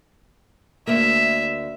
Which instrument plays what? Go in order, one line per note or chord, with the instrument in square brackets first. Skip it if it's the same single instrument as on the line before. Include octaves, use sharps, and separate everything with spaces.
[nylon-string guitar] D2 A#3 [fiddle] E5